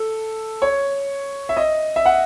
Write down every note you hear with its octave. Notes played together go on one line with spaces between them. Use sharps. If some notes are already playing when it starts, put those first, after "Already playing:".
Already playing: A4
C#5
E5
D#5
E5
F#5